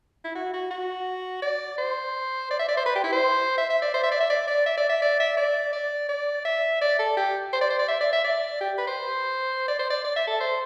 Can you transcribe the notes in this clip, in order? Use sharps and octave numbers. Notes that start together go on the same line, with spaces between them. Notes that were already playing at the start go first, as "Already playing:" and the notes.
E4
F#4
F#4
F#4
D5
C5
D5
E5
D5
C5
B4
G4
E4
C5
E5
E5
D5
C5
E5
D5
E5
D5
D5
E5
D5
E5
D5
E5
D5
D5
D5
E5
D5
A4
G4
C5
D5
C5
D5
E5
D5
E5
D5
G4
B4
C5
D5
C5
D5
D5
E5
A4
C5